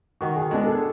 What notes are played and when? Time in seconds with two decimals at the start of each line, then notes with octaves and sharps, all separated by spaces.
0.21 D#3 F#4
0.36 G#4
0.51 G#3 B3 D4 A4
0.67 A4